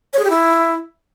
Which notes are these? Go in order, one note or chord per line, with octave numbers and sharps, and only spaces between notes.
C#5
G#4
G4
E4